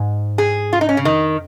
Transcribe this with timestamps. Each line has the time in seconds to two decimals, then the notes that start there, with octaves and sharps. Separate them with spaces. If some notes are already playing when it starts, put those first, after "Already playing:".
Already playing: G#2
0.38 G#4
0.73 F4
0.81 D#4
0.89 C#4
0.97 C#3
1.05 F2 D#3